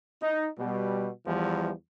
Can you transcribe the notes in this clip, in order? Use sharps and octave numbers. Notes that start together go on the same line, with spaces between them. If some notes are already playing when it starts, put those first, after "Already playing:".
D#4
B2 G3
E2 E3 F3 G3